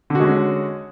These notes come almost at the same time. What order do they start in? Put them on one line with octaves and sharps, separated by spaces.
D3 F#4 G#3 C#4